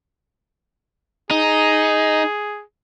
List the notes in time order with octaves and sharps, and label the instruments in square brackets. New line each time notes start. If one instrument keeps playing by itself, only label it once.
[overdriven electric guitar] D#4 [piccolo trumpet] G#4